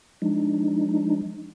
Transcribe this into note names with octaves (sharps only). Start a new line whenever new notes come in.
F3 G#3 D4 D#4